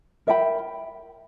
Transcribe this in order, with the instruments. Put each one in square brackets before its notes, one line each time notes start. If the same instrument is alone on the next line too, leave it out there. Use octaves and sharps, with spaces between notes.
[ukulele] A#4 E5 G5 B5